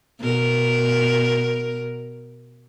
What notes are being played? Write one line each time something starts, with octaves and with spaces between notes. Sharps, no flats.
B2 A#4